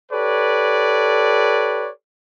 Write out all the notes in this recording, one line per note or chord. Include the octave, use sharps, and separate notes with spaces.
G4 A4 B4 C#5 D5